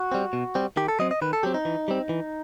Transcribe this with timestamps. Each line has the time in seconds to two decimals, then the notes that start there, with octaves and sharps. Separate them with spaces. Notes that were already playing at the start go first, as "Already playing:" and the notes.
Already playing: F#4
0.12 G3 C4
0.33 B2
0.55 G3 C4
0.77 D#3 G4
0.88 A4
0.99 F#3 C4 D#5
1.11 D#5
1.22 D#3 B4
1.33 A4
1.43 F#3 C4 G4
1.54 D#4
1.65 E3
1.88 G3 C4
2.09 E3